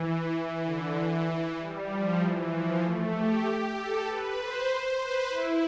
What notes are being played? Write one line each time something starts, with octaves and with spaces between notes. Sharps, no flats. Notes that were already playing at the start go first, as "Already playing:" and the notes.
Already playing: E3
E3
D3
E3
G3
F3
E3
F3
A3
G4
G4
A4
B4
C5
B4
E4